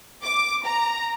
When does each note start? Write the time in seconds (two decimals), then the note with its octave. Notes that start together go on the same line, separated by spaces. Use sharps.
0.23 D6
0.66 A#5